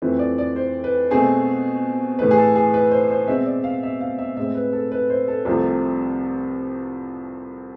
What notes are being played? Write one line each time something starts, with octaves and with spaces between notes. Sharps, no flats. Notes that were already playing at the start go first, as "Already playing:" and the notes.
F2 E3 A3 C4 B4
D5
D5
C5
B4
B2 A3 C4 G#4
A2 E3 A3 B4
G#4
A4
G#4
B4
C5
C5
B2 G#3 C4 E5
D5
F5
E5
F5
E5
A2 G#3 C4 E5
B4
A4
B4
C5
A4
C2 C3 F3 A3 C4